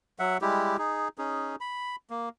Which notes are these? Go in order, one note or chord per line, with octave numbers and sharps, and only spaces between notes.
F#3 E5 F#5
G3 G#3 E4 G4
D#4 G#4
C#4 D#4 G#4
B5
A#3